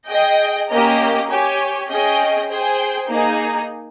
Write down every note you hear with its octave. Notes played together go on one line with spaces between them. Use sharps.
G#4 D#5 G5
A#3 C#4 G4 A#4 D#5
G4 C#5 G#5
C#4 G#4 D#5 G5
G#4 C5 G5
A#3 D#4 G#4